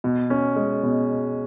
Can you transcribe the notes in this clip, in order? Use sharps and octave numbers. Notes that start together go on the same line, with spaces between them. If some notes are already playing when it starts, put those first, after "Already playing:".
B2
C#4
G#3
B2